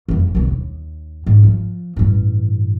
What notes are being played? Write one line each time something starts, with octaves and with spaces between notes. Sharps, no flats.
F#1 F2
B1 D3
D#2
G#2
F3
A1 G2